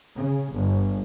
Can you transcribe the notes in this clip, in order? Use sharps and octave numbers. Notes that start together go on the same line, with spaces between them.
C#3
G1